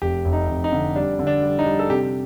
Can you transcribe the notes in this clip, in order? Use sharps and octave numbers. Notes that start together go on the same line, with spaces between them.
F1 G4
F1
D#4
F1
D#4
D3
G3 D4
D3
D4
G3
D#4
G3
A4
C3 G4